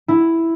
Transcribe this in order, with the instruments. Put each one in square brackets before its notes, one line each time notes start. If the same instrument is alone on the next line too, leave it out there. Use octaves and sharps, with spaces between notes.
[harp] E4